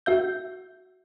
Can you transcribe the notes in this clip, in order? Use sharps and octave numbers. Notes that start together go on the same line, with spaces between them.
F#4 E5 G6